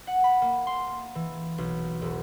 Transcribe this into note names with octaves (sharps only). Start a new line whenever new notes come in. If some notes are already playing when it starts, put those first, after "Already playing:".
F#5
B5
A#3
C6
E3
B1
E1